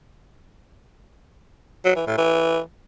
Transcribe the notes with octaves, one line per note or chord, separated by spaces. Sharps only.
F#3
E3
A2
E3